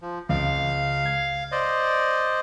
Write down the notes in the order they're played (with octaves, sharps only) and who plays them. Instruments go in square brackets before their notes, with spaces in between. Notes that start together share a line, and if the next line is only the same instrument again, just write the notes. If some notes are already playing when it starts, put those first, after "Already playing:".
[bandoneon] F3
[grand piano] C#2 [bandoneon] F5
[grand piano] G#6
[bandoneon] C5 D5 D#5